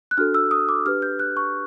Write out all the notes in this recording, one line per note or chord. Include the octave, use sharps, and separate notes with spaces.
F#6
D4 F#4 A4 F6
E6
D#6
D6
D4 G4 B4 F6
G6
F#6
C#6